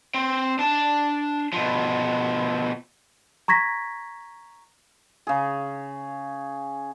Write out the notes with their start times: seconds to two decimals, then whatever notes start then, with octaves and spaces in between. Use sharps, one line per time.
0.14 C4
0.59 D4 A5
1.53 B2 F3
3.48 A#5 C#6 G#6 A#6 B6
5.27 C#3 G#4